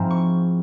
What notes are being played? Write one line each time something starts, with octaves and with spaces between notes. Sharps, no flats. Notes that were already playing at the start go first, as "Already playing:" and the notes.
Already playing: G#2 F3 C4 E4 G#5 A#5
C#6